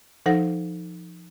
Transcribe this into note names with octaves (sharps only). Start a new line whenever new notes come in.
F3 D#4 A4 C5 F#5 A#6